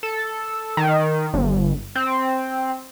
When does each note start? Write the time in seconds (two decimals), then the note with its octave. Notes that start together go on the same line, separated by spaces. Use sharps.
0.03 A4
0.77 D#3
1.34 G1
1.95 C4